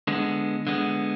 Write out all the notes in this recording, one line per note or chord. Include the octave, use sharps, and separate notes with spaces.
D3 G#3 B3
D3 G#3 B3